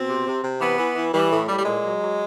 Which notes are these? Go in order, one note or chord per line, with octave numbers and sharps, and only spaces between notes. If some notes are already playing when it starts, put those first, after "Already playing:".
Already playing: B2 C4
C3
C3
C3
E3 B3
E3
E3
E3 G3
A2
A2 G3
G3
A#2 G#3
F#3
F#3